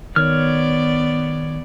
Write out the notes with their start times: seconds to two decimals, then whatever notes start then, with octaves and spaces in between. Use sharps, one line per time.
0.16 D#3 B3 C#5 D5 F6